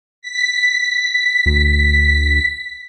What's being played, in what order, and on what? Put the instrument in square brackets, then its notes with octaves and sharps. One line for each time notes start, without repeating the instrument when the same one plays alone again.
[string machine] B6
[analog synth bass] D2